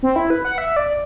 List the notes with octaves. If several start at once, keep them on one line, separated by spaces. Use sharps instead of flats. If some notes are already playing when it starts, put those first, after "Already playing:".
C4
E4
B4
F#5
E5
D5